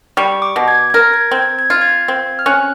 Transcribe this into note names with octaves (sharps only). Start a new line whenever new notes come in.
G3 C#6
D6
B2
G#6
A#4 G#6
G#6
C4 G#6
G#6
F4
G#6
C4
F6
C#4 F#6